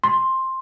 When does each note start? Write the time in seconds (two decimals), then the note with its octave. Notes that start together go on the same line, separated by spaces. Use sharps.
0.04 C6